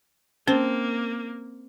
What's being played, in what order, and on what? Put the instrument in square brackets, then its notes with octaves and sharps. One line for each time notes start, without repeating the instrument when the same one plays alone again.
[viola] A#3 [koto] C4 [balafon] C#4